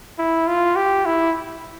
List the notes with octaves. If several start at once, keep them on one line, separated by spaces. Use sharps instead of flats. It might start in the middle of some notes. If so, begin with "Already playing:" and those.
E4
F4
G4
E4